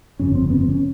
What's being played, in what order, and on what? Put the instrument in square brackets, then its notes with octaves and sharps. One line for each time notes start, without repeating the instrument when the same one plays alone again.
[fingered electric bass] G1 F2 C#3 C#4
C4
B3
C4
C#4